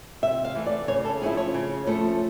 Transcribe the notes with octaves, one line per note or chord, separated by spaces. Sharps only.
C3 E5
F5
E3 A3
D5
C#3 C#5
A4
F3 A3 C#4 E4 G#4
C#5
C#3
F3 A3 C#4 E4